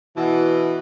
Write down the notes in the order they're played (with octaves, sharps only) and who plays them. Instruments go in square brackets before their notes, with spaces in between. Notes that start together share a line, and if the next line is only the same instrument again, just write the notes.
[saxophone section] B2 E3